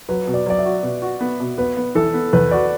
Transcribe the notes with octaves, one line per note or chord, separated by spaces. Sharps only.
F#3 B4
B2
D5
F#3 D5
E5
F#4
B2
F#4
B3
B2
B3 B4
B3
E3 A4
B3
E2 B4
F#4 D5